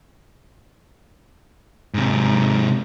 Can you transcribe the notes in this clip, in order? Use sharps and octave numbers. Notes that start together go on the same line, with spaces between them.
G#2 C3